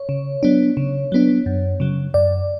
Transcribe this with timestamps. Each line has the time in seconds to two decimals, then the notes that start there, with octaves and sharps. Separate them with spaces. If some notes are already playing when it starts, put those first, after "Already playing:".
Already playing: C#5
0.09 C#3
0.43 F#3 B3 D4
0.77 C#3
1.12 F#3 B3 D4
1.46 F#2
1.80 C#3 F#3
2.14 F#2 D5